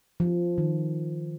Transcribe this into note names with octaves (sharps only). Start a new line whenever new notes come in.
F3
D#3